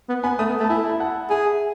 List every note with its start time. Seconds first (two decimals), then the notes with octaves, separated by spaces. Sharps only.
0.09 B3
0.23 B3 G#5 B5
0.39 A3 B5 D#6
0.49 B3
0.60 A3
0.64 A5
0.69 E4 E5 G#5
0.90 B5
1.00 F#5 A5
1.30 G#4 E5 G#5